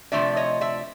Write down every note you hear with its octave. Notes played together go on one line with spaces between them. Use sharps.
C3 F3 A3 D4 D5 E5
C#5 D#5
D5 E5